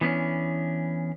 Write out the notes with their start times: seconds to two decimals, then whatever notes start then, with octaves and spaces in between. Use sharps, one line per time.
0.01 E3 B3 C#4 D4